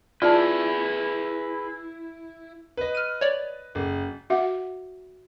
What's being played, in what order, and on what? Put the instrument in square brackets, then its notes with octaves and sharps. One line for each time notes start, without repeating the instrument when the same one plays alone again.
[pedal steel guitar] E4 [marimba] F4 [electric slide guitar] G#4 B4 [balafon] D5 A5
[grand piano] B4 D#5
[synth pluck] F6 D#7
C#5 D5
[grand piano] F#1
[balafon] F#4 E5 F#5